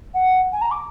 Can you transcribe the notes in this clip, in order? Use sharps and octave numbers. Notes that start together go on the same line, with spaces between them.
F#5
G#5
A#5
D6